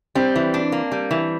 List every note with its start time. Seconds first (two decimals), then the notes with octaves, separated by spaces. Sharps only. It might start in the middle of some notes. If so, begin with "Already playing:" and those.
0.15 G3 C4
0.36 E3
0.54 D4
0.72 A#3
0.92 G3
1.11 E3